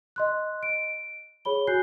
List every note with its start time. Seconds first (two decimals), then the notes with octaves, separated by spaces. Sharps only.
0.16 D#5 C6 F#6
0.63 D7
1.45 G#4 C#5 B5 G7
1.67 F#4 G#5 F#6 G6 C7